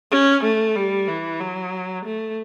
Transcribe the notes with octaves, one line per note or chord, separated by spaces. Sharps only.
C#4
A3
G3
E3
F#3
A3